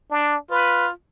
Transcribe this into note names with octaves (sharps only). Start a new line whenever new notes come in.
D4
F4 B4